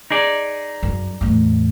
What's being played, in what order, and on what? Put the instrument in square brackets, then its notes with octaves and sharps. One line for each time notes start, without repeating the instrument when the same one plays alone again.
[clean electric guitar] D#4 G#4 D5
[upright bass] F#2
E2 A2